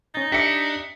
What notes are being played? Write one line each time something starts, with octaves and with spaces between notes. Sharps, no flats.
C#4 D#4 A6
D4 G4 D5 E5 B6 C#7